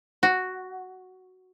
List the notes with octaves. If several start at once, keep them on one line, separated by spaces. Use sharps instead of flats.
F#4